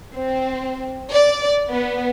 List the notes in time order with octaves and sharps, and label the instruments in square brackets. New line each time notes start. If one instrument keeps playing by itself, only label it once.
[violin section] C4
D5
B3